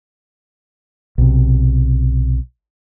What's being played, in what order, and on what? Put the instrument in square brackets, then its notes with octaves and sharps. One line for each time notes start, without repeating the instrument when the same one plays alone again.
[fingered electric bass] B1 C3